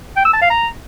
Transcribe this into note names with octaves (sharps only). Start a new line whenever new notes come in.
G5
E6
A5
F5
A#5